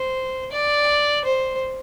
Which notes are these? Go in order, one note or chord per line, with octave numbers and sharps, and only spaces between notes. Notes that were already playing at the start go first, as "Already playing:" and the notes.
Already playing: C5
D5
C5